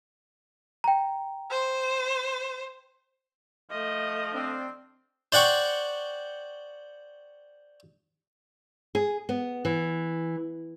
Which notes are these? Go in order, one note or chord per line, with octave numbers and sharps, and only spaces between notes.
G5 A#5
C5
F3 A3 D#5
C4 D4
C5 D5 F#5 G5 C#6
G#4
B3
E3